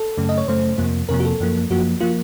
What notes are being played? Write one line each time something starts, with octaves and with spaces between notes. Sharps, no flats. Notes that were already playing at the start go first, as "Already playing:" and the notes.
Already playing: A4
F#2 C#3 A3
D#5
C#5
F#2 C#3 A3 C5
F2 C3 F3 A#3
F2 C3 F3 A#3 A#4
F#4
A4
F#2 F3 A#3
F#2 F3 A#3 F#4
F3 A#3 F4